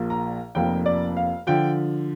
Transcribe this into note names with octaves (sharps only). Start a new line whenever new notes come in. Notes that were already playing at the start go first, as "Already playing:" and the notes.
Already playing: A#1 A#2 F3 A#3
A#5
F1 F2 F3 A#3 G5
D5
F5
D3 F3 G5